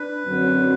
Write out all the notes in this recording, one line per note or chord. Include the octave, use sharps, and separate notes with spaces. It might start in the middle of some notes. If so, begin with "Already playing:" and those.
Already playing: D4 B4
F#2 D3 F#3 C4